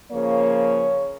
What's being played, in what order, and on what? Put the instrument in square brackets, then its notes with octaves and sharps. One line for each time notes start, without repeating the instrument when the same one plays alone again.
[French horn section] C#3 F3 A#3 C#5